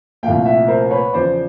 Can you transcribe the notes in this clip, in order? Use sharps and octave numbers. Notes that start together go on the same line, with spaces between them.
C2 A#2 F3 A3 F5 G5
E5 F#5
A#4 C5
B4 C#5
E2 C#3 F3 C5 D5